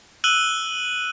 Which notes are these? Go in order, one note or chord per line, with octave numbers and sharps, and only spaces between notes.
E6 F#6 D#7 F#7 G7